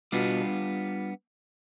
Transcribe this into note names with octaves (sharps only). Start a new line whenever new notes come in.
B2 G3 B3 D4 F4